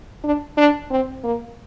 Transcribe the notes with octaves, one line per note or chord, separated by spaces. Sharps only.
D4
D4
C4
A#3